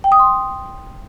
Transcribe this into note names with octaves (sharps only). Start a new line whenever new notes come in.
G5
D#6
C6